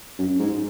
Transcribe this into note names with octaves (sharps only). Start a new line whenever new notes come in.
F#2
G#2